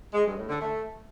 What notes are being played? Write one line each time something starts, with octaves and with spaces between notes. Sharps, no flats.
G#3
G2
A2
D3
A3